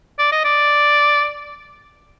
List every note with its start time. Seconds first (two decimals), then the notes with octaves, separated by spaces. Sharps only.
0.19 D5
0.32 D#5
0.44 D5